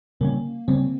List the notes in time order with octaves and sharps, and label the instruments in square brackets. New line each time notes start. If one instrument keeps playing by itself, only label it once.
[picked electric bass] C#3 G3 C#4 [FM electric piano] A#3
[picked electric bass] C#3 G3 C#4 [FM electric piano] C4